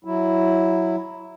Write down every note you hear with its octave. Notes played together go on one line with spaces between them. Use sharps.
F#3 E4